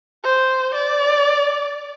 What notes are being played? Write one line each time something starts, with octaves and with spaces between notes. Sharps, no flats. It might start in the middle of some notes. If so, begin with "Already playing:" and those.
C5
D5